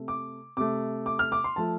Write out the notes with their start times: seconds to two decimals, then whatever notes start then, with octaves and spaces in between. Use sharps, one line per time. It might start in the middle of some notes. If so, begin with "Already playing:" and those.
Already playing: C3 A3
0.08 D6
0.57 C3 A3 D6
1.06 D6
1.19 F6
1.32 D6
1.44 C6
1.56 F3 A3 A5